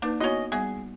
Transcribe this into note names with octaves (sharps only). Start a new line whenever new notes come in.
A#3 D4 D#4 B4
B3 C#4 E4 F#4 D#5
G3 B3 G#4 E5